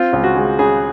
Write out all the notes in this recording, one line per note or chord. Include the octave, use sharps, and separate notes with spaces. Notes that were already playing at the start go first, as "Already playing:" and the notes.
Already playing: C4 F4
C#2 F4
F#4
G#3
C#3 G#4